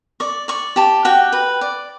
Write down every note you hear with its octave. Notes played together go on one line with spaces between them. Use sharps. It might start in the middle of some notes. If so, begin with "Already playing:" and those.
D5 C#6
D5 C#6
G4 A5
F#4 G5
B4
D5